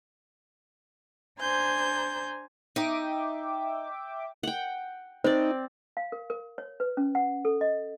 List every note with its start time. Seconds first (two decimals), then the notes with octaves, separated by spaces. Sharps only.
1.40 D4 C5 G#5 A#5 G6
2.76 D#4 D#5 E5 G5 D6
4.43 F#5 G5
5.24 C4 D#4 C5 D5
5.97 F5
6.12 A#4
6.30 A#4
6.58 C#5
6.80 B4
6.97 C#4
7.15 F#5
7.45 A4
7.61 D#5